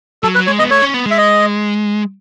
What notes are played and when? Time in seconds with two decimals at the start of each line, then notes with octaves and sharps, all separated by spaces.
0.23 F#3 A4
0.35 B4
0.39 F#3
0.47 G#3 C#5
0.59 B3 D#5
0.71 A3 C#5
0.82 C#4
0.94 B3
1.06 G#3 E5
1.17 D#5